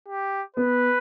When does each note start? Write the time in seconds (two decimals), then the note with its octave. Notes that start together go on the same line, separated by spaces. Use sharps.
0.08 G4
0.56 B3 B4